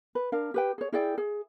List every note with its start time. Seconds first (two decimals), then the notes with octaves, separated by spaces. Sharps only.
0.15 B4
0.32 D4 A#4 F5
0.54 G4 B4 G5
0.78 G#4 C#5
0.92 E4 G#4 D5 G5
1.18 G#4